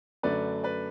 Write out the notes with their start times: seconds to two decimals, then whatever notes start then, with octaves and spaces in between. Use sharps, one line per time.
0.23 F#2 D3 A3 D4 B4 D5
0.64 B4 D5